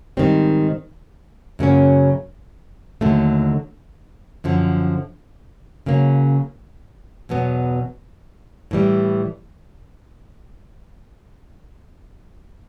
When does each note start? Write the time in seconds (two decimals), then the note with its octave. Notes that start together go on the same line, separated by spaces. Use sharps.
0.17 G#2 D#3 G3 C4
1.59 F#2 C#3 F#3 A#3 C#4
3.01 D#2 D3 F#3 A3
4.44 F#2 D3 F3
5.86 C#3 F#3 A#3 C#4
7.29 E2 B2 F#3 B3
8.71 A2 E3 G3